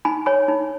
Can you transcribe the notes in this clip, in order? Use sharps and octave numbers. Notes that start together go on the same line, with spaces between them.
D#4 G#5 B5
C#5 G#5 B5
D#4